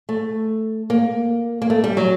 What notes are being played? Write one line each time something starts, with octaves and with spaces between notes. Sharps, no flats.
A3
A#3
A#3
A3
G3
F#3